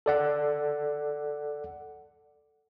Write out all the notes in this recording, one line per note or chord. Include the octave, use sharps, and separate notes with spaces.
A4 D5 F#5